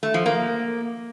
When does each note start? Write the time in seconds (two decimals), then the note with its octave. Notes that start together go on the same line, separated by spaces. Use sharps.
0.03 A3
0.14 F3
0.26 A#3